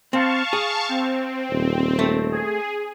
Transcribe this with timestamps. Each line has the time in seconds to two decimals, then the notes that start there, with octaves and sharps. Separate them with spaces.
0.13 C4 F5 A5 C#6
0.53 G#4
0.89 C4
1.51 D#1
1.99 A3
2.32 G#4